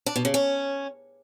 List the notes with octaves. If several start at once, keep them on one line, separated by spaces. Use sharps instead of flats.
D4
B2
C#3
C#4